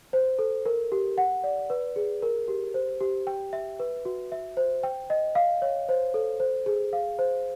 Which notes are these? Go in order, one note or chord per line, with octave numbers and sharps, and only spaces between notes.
C5
A4
A#4
G4
F#5
D5
B4
G#4
A#4
G4
C5
G4
G5
E5
B4
F#4
E5
C5
G5
D#5
F5
C#5
C5
A4
C5
G#4
F5
C5